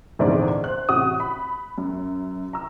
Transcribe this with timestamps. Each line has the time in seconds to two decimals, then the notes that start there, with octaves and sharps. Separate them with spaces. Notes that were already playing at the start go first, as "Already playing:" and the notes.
0.19 A#1 E2 G#2 D3 C4 D5
0.64 C5 F#6
0.89 A1 C3 F#4 D#6
1.20 B5
1.78 F#2
2.53 A#5 E6